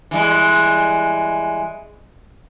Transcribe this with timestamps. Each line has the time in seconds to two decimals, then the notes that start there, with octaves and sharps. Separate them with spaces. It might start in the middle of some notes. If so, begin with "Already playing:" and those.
0.11 E3 G3 G#3